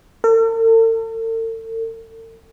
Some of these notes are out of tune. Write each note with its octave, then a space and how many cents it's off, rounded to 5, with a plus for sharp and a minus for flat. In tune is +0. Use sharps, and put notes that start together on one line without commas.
A4 +45